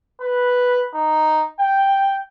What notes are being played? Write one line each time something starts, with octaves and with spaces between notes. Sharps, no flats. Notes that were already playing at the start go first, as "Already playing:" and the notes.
B4
D#4
G5